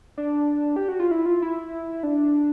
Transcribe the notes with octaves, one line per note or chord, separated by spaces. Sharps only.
D4
G4
F#4
F4
E4
F4
E4
D4